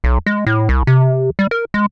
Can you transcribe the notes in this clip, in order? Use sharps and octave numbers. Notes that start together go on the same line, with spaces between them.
B1
G#3
A2
C2
C3
G3
A#4
G#3